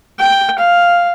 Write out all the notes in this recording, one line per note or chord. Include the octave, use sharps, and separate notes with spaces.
G5
F5